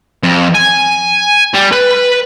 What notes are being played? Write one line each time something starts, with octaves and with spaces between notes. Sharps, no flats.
F2
G#5
G3
B4